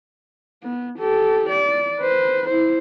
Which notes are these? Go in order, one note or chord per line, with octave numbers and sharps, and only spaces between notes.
B3
G4 A4
D5
B4 C5
E4 C5